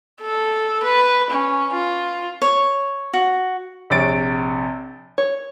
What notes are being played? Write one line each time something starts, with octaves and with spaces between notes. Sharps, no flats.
A4
B4
C#4
F4
C#5
F#4
A#1 C3 C#5 A6 D7
C#5